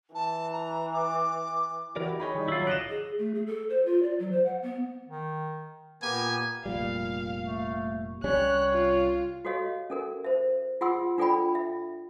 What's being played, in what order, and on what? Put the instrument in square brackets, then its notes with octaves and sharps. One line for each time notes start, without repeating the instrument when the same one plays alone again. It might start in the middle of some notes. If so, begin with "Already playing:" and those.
[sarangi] E3 [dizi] A5
[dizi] A#5
D6
[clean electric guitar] E3 A#4 D5 [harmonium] E4 F#4 G4
[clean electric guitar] D#4 D#5 G5 [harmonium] G#4 [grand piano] C#5 B5
[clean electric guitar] D#3 [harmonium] G3 D#4
[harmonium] F#3 [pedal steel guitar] E4 F4
[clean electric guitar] D3 [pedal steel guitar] D5 D#5 [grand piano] F#6 E7
[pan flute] G#4
A3
G#4
A4
C5
F4
D5
F#3
C5
F#5
B3
[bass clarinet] D#3
[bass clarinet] A#2 [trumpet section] A#3 B3 G4 [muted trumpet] G#5
[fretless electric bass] F1 A#2 G3 [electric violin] F5
[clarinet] A3
[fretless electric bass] C2 G3 C#4 [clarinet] C#5 [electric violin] F#6
[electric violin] F4
[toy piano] F#4 G4 A4 C#5 D#5 F5
C#4 A4 A#4
C5 E5
F4 G#4 F#5 C6 E6
D4 F4 A4 D5 G5 B5
E5